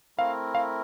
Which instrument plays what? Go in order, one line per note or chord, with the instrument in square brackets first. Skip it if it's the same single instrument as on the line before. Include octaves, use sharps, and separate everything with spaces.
[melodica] A3 C4 E4 A#4 [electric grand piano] F5
[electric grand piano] F5